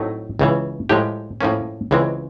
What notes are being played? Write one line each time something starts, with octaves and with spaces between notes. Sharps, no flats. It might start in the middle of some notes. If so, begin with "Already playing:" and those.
Already playing: A2 F#3 A3 C4 D#4
C#2 C#3 E3
A2 F3 G#3 G4
A2 F3 A#3 C#4
C#2 C#3 E3 G#3 C4